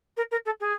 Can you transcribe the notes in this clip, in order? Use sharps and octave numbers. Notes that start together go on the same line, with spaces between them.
A#4
A#4
A4
G#4